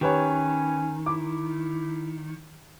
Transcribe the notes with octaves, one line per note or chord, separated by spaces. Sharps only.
D#3 C#4 G4 B4 C#5
E4 D6